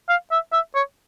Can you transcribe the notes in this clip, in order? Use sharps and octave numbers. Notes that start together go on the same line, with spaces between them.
F5
E5
E5
C#5